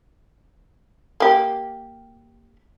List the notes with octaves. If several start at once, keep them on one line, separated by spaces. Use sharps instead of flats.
A#3 G4